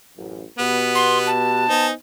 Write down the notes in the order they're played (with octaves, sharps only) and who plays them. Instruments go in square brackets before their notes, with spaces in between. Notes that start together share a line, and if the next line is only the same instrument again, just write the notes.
[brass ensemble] A1 F#2
[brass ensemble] B2 G4 B4 [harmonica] B3
[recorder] C6
A5
[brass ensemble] B3 C5 G#5 [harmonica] D#4